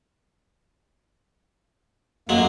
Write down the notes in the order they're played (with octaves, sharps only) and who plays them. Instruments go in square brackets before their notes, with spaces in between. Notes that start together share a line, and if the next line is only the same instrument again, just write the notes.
[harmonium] F#2 A#3 [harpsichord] F#3 G#3